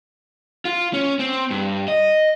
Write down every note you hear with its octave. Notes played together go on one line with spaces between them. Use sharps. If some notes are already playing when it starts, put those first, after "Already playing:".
F4
C#4
C4
G2
D#5